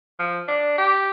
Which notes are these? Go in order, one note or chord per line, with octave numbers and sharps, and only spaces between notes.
F3
D4
G4